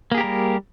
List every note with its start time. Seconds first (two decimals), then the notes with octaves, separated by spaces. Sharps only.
0.12 A#3
0.15 G#4
0.18 G4
0.21 A#4
0.24 G3